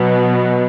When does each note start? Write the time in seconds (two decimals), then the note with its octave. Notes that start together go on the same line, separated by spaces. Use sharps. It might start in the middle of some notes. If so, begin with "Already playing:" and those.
Already playing: B2 F#3 B3